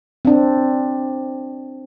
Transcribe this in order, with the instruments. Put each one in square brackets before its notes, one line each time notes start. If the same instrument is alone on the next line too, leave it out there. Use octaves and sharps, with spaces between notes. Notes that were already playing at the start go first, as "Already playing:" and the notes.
[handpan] C4 D4